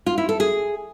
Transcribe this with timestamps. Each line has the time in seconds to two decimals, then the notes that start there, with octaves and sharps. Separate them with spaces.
0.06 F4
0.18 E4
0.29 A4
0.40 G#4